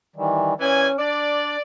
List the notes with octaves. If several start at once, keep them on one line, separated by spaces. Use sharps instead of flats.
D#3 E3 G3
A#2 E3 C#4 G#5
D4 D5